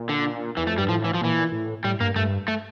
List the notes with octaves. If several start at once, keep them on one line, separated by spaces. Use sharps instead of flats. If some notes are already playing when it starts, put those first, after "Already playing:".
Already playing: A#2
D3
E2 E3
F2 A3
G2 G3
A2 F3
E3
F3
A#2 E3
A2
A2 G3
G2 A#3
G2 A3
A3